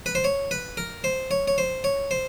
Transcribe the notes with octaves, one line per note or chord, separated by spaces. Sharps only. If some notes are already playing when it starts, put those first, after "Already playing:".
B4
C5
C#5
B4
A#4
C5
C#5
C#5
C5
C#5
C5